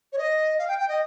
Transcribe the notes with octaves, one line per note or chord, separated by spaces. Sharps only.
C#5
D#5
F5
G5
G5
D#5